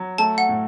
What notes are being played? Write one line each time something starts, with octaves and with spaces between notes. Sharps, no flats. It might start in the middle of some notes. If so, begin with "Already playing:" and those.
Already playing: F#3
A3 A5
F#5
A2